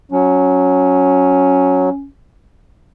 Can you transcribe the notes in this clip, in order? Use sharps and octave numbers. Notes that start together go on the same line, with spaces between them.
F#3 C#4